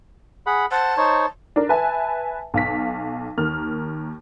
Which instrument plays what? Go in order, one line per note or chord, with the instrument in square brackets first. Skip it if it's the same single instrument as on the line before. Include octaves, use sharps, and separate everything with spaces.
[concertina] G#4 F#5 B5
[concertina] C5 F#5 [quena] A5
[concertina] D#4 C5 C#5
[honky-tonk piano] D4 A#4
B4 E5 G#5 A5
B1 F5 B6
D#2 A#4 F6